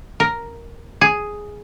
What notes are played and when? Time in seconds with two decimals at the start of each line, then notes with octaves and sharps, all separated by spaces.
0.20 A#4
1.01 G#4